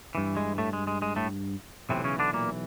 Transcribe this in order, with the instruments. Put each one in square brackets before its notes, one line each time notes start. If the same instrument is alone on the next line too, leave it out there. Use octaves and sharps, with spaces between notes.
[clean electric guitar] G2 E3
G#3
A2 A3
G#3
G#3
G#3
A2 A3
B1 A2 C3 E3 C4
C#3 C#4
D3 D4
A#2 A#3